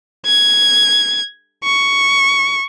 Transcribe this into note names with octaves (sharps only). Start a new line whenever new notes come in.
G#6
C#6